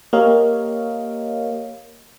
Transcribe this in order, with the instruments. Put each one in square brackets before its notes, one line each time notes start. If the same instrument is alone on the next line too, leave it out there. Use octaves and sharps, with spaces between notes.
[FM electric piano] A#3 G4 A#4 C#5 D#5 F5